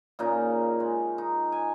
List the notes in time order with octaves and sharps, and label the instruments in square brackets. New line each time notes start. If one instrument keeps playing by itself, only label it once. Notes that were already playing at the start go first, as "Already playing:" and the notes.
[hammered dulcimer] A#2 C#3 D#4
G#3
D#4
G#5